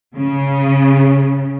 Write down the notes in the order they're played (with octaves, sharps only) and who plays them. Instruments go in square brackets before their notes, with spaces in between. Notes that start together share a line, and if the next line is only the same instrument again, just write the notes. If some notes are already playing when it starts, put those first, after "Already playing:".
[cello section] C#3